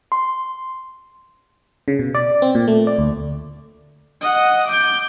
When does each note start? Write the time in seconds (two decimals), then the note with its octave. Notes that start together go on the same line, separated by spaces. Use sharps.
0.12 C6
1.88 C#3
1.99 B2
2.15 D5
2.42 C4
2.55 A#2
2.67 A3
2.87 D5
2.98 D2
4.21 D#5 F#5
4.67 D6 G6